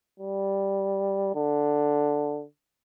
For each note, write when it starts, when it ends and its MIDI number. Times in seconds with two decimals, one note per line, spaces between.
0.20 1.33 55
1.34 2.43 50